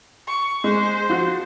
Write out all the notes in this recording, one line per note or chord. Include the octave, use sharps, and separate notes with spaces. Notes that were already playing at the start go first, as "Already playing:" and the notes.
C#6
G#3 C5
F3 F#4